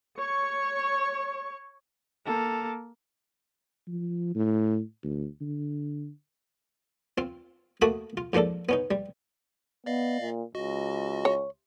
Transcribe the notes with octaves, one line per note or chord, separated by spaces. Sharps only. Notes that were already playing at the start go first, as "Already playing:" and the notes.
C#5 C#6
A#3 A4
F3
A2
D2
D3
C4 F4
A3 A#3 F#4 A5 B5 D#6
F4
G#2 F3 A#3 D4 A4
B3 C#4 D#4
G3
B3 D5 D#5 F5
A#2
C#2 F#4 D#5
C#5